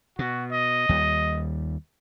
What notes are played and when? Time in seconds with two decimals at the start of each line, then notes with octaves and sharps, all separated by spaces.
0.19 B2 F#4
0.52 D#5
0.89 D#2 G3